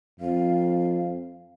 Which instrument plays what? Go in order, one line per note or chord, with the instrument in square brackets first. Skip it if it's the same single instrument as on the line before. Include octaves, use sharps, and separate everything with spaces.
[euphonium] F2 [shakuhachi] F5